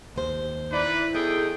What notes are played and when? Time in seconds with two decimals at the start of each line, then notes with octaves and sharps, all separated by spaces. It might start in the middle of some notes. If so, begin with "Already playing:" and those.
0.16 D#2 C5
0.72 D#4 E4 B4 D5
1.15 E2 D#4 G#4 A4 G5